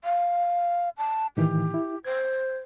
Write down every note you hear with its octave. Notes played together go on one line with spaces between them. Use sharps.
F5
A5
A2 D#3 E3 G4
E4
C5 G#6